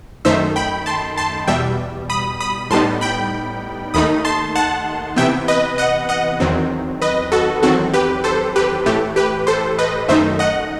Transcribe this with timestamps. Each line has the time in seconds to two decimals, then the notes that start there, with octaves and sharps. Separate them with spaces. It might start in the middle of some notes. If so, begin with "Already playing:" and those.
0.25 F#2 D#3 A3 D#4 C5 E5
0.56 G5 B5
0.86 A5 C6
1.18 A5 C6
1.48 E2 B2 G3 E5 G5
2.10 B5 D#6
2.40 B5 D#6
2.70 A2 G3 B3 D#4 A5 C6
3.01 G5 B5
3.94 D#2 D#3 A3 D#4 B5 D#6
4.25 A5 C6
4.56 F#5 A5
5.16 C3 E3 B3 E5 G5
5.48 B4 D#5
5.78 D#5 F#5
6.09 D#5 F#5
6.40 E2 D#3 F#3 C4
7.02 B4 D#5
7.32 F#4 A4
7.63 E2 D#3 F#3 C4 F#4 A4
7.94 G4 B4
8.24 A4 C5
8.56 G4 B4
8.86 A2 E3 A3 G4
9.16 G4 B4
9.47 A4 C5
9.79 B4 D#5
10.08 F#2 D#3 A3 D#4 C5 E5
10.39 D#5 F#5